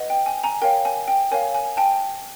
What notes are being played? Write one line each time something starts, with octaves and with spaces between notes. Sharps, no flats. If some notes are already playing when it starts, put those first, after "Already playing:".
Already playing: B4 D#5 F#5
G5
G#5
G#5 A#5
A#4 C#5 F5 G5
G#5
G5
A#4 C#5 F5 G#5
G#5
G5 A5